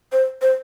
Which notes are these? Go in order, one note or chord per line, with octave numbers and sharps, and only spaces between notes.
C5
C5